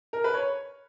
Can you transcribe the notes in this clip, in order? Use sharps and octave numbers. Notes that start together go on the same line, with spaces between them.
A#4
B4
C#5